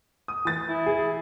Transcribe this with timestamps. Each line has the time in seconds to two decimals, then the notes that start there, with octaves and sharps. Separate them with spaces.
0.28 D#6
0.45 E3 A6
0.68 E4
0.86 G#4